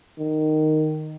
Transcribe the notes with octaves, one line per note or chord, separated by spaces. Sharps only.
D#3